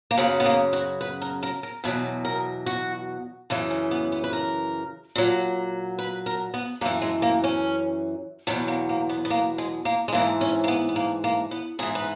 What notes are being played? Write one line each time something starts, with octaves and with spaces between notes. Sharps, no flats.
A#3
F#2 C#3 F#3 B3
B3
A#3
F#4
B4
A#4
A#4
A#4
E2 B2 F#3 B4
A#4
F#4
F#2 C#3 E3
C#4
B3
B3
B4
A#4
A#2 F#3
B4
A#4
B3
F#2 E3 A#3
G#3
A#3
C#4
E2 B2 F#3 B3
A#3
A#3
B3
B3
A#3
G#3
A#3
G#3
G#2 E3 A#3
C#4
A#3
B3
B3
A#3
A#3
B3
G#2 E3 G#4
B4